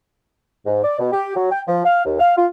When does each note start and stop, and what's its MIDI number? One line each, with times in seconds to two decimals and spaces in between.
0.66 0.82 44
0.83 0.98 74
0.99 1.11 47
1.12 1.34 67
1.36 1.50 54
1.51 1.61 79
1.67 1.82 53
1.85 2.04 77
2.05 2.19 39
2.19 2.34 77
2.37 2.47 65